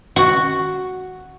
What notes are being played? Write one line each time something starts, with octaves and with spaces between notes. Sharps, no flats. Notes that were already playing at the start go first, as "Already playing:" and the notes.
F#4